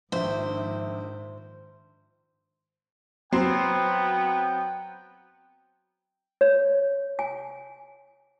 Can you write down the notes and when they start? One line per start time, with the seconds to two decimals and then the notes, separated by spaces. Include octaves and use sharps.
0.12 A#1 G#2 D#3 C5 E5
3.32 F#3 B3 C4 G5 C7
6.41 C#5
7.19 G#5